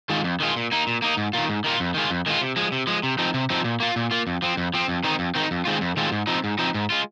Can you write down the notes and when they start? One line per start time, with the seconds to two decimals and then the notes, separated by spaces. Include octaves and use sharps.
0.10 D#3 G#3 F4
0.24 F2
0.40 D#3 G#3 F4
0.56 A#2
0.72 A#3 D#4
0.87 A#2
1.02 A#3 D#4
1.17 G#2
1.33 D#3 A#3 F4
1.49 G#2
1.64 D#3 A#3 F4
1.80 F2
1.94 D#3 G#3 F4
2.10 F2
2.26 D#3 G#3 F4
2.41 C3
2.56 F3 G#3
2.72 C3
2.87 F3 G#3
3.03 C3
3.19 F3 C4 D#4
3.34 C3
3.50 F3 C4 D#4
3.64 A#2
3.80 A#3 F4
3.96 A#2
4.11 A#3 F4
4.27 F2
4.42 F3 C4
4.57 F2
4.74 F3 C4
4.88 F2
5.04 D#3 C4 D#4
5.19 F2
5.35 D#3 C4 D#4
5.51 F2
5.65 D#3 G#3 C4 F4
5.81 F2
5.97 D#3 G#3 C4 F4
6.12 G#2
6.27 F3 C4 D#4
6.44 G#2
6.59 F3 C4 D#4
6.74 G#2
6.90 G#3 F4